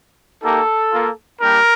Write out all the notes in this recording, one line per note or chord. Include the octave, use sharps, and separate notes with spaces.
A#3 D#4 G4 A4
A#3 F4
G3 A#3 D4 G4 A#4